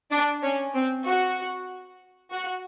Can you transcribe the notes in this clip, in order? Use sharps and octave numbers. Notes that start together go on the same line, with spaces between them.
D4
C#4
C4
F#4
F#4